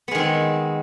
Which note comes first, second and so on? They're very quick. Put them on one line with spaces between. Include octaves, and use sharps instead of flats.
B3 G#3 D#3 C4